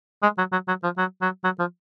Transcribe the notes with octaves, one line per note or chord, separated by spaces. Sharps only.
G#3
F#3
F#3
F#3
F3
F#3
F#3
F#3
F3